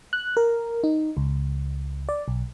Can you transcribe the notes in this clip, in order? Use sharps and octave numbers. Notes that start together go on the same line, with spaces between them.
F#6
A#4
D#4
C#2
D5
B1